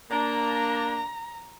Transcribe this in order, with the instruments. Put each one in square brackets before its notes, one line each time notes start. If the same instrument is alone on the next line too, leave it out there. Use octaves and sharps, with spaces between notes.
[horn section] A#3 D4 [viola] A#5